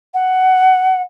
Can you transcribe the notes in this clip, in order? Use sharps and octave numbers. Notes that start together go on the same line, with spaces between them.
F#5